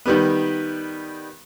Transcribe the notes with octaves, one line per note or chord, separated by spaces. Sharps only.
D#3 G3 B3